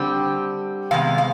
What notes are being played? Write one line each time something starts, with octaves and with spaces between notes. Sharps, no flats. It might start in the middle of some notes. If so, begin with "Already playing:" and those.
Already playing: D3 G3 C4 G4
C3 D#3 G#3 B3 F5
F5